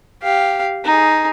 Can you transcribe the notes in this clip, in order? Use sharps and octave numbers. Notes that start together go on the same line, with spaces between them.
G4 F5
D#4 G#4